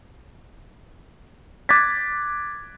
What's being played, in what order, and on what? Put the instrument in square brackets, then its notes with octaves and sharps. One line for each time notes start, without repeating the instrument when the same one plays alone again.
[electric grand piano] D6 F#6 G#6 A6 B6